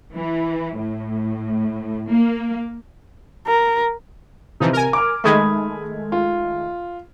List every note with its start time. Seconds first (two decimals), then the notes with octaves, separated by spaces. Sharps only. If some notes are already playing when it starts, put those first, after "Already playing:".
0.14 E3
0.76 A2
2.08 A#3
3.47 A#4
4.60 C3 E3 F3 D#4
4.73 A#4 G#5
4.93 D6 F6
5.24 D#3 G#3 A3 B5 D#6 G#6
6.12 F4